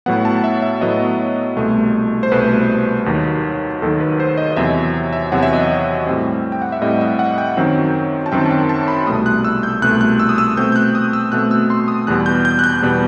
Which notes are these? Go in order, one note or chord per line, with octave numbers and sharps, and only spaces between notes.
A2 F#3 B3 F#5
A5
E5
E5
A2 F#3 B3 D#5
C2 B2 A3
C5
C2 B2 A3 B4
D#2 D#3 F#3
D#2 D#3 F#3 A4
B4
C5
D#5
D#5
E2 C3 F#3 E5
E5
E2 C3 F#3 F#5
E5
D#5
E5
A2 G3 C4
G5
F#5
E5
A2 G3 C4 D#5
E5
F#5
G5
F#2 D#3 F#3 C4
A5
F#2 D#3 F#3 C4 G5
A5
G5
A5
C6
B5
C2 B2 A3 D#6
F#6
E6
G6
C2 B2 A3 F#6
F#6
E6
D#6
E6
B2 A3 C4 G6
G6
F#6
D#6
E6
B2 A3 C4 F#6
E6
C6
D#6
E2 B2 G3 B3 F#6
G6
G6
F#6
G6
E2 B2 G3 B3